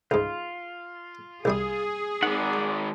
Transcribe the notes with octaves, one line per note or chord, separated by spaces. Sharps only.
C#2 G#2 F4
C2 G3 G#4 D#6
D#3 G#3 D5 F#5